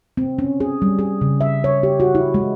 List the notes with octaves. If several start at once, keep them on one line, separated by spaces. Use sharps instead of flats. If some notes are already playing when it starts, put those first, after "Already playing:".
C4
C#4
G#4
G3
G#4
C#3
E5
C#5
G4
F#4
E4
G#3